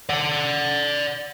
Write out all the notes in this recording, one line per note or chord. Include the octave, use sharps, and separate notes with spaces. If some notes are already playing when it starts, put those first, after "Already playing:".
D5 F#5